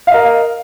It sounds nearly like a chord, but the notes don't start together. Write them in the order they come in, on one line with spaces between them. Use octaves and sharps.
F5 D#5 A#4